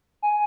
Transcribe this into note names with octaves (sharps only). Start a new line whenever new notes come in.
G#5